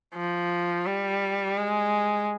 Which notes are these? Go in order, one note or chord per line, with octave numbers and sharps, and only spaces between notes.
F3
G3
G#3